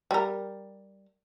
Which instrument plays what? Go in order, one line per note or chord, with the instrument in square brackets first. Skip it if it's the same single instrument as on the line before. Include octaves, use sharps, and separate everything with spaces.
[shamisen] G3 A#4